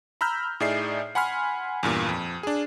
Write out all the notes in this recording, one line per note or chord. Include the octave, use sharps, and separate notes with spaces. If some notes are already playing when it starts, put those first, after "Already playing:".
A#5 B5 E6 F6 G6
A2 D#4 G#4 D5 E5 C7
F#5 G#5 B5 C6 F6
E2 G2 A#2
F2
D4 G#4